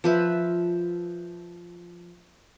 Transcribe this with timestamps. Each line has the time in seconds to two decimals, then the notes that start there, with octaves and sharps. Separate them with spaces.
0.04 F3 B4 E5